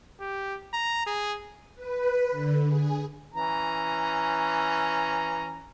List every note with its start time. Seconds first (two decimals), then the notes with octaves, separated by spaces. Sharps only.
0.21 G4
0.74 A#5
1.07 G#4
1.75 B4
2.31 D3
2.67 G#4
3.34 E3 C#4 A#5